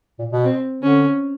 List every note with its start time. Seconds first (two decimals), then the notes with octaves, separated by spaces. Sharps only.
0.19 A#2
0.32 B2
0.44 C4
0.83 D3 C#4